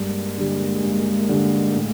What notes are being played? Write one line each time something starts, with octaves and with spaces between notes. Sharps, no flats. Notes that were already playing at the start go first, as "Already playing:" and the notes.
Already playing: G2 G#3 A#3
D3 G3
G2
D3 G3
A2